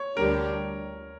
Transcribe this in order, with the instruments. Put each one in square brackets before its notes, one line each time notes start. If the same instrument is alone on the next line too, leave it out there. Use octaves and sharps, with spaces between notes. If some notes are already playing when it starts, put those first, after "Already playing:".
Already playing: [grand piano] C#5
[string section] D2 D3 G3 D4 G4 [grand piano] A#4